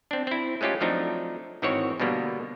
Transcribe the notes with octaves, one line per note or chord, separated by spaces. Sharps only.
C4 D4
C4 E4
G#3 A3 C#4 F4 G4
F3 F#3 A3 C4 D4 D#4
G#1 D#3 E3 C4 F#4 C#5
B2 D3 G3 A#3 B3